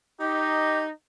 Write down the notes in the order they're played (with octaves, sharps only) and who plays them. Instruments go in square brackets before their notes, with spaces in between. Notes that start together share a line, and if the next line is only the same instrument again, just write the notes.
[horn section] D#4 [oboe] G4